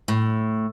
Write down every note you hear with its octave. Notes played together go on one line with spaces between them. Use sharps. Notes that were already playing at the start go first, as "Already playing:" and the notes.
A2